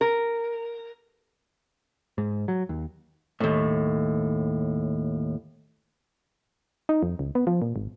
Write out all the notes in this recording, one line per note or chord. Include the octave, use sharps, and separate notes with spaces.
A#4
G#2
F#3
D#2
D#2 A2
D#4
F2
C#2
B3
F3
A#2
G#1